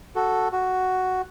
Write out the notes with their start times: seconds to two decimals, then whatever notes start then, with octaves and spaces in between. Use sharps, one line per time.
0.15 F#4 A4
0.52 F#4